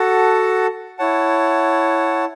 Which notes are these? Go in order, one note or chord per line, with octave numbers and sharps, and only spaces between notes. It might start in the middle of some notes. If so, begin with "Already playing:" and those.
Already playing: F#4 A4 F#5 A5
E4 C#5 F#5 A5